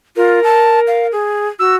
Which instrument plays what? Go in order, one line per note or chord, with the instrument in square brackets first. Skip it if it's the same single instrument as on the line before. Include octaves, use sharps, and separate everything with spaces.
[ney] F4 [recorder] A#4
[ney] A5
F5
G#4
[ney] F#4 [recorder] E6